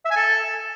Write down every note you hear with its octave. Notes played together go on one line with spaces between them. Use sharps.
E5
G#5
A4